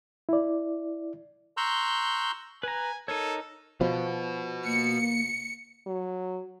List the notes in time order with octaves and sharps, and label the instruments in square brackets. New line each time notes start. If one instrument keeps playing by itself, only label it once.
[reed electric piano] E4 D5
[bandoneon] A#5 C6 C#6 E6 F#6 G6
[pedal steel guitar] B4 A#5 [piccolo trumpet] G#5
[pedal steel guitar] D#4 A#4 C#5 [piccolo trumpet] A4
[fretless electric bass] B2 F3 [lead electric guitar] F#4 B4
[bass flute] A#3 [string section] C#7
[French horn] F#3